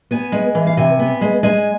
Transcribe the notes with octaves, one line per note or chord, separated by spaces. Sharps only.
B3 G#5
G#3
E3
F5
C3 G#5
B3
G#3
G#3 G#5